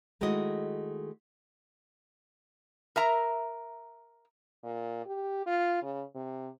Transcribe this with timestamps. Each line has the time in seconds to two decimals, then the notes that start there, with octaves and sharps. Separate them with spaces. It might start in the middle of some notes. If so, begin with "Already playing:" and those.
0.21 D#3 G#3 A3 E4 F#4 D#5
2.96 A#4 E5 A#5
4.64 A#2
5.06 G4
5.46 F4
5.82 C#3
6.15 C3